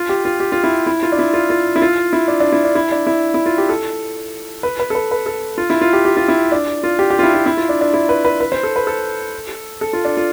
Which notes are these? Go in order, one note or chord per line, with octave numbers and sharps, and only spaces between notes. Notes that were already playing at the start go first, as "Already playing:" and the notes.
Already playing: F4
G4
F4
G4
F4
E4
E4
F4
D4
E4
F4
F4
E4
F4
E4
D4
D4
E4
D4
E4
D4
E4
E4
F4
G4
A4
B4
B4
A4
B4
B4
A4
F4
E4
F4
G4
G4
F4
E4
D4
F4
G4
G4
F4
E4
F4
E4
F4
D4
D4
E4
B4
B4
B4
C5
A4
B4
A4
A4
F4
D4
F4